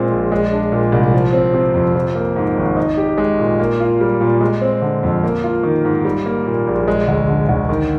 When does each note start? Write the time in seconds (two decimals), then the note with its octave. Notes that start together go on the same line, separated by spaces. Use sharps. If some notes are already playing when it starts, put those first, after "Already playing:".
Already playing: A#2 G#3 C4
0.11 A#1
0.32 G#3
0.52 D4
0.72 A#2
0.92 C2
1.14 F3
1.33 C4
1.54 C3
1.74 F2
1.95 F3
2.15 A#3
2.36 G#2
2.57 G#1
2.77 D#4
2.97 G4
3.18 G#3
3.39 A#2
3.59 A#3
3.80 F4
4.01 G3
4.21 A#2
4.41 G#3
4.61 C4
4.82 D3
5.03 F2
5.24 A#3
5.44 F4
5.63 D#3
5.85 G#2
6.05 G3
6.26 A#3
6.46 A#2
6.67 A#1
6.88 G#3
7.08 D2
7.28 D3
7.49 D2
7.69 D#3